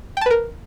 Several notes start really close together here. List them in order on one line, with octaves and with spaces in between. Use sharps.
G5 A5 B4 A#4